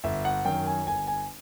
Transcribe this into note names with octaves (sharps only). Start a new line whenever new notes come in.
G1 E5
F#5
F#2 D#3 G5
G#5
G1 G#5
G#5